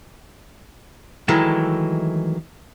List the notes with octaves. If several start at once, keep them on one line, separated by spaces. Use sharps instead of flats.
D#3 E3 F#3 G#3 A3